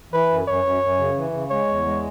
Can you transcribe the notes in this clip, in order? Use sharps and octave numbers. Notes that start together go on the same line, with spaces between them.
E3 B4
F#2
F#2 C#5
F#2
F#2
C#3
E3
C#3
G#3 C#5
E2
G#3